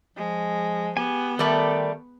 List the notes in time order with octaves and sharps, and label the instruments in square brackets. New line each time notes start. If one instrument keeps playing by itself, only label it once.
[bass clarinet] F3 [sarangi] G#3
[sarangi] B3 [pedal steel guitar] G4 G#5
[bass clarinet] D#3 [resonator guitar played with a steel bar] G3 A3 [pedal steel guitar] A4 D5 B5